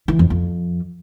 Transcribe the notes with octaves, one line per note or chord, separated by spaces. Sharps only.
E3
F2
F2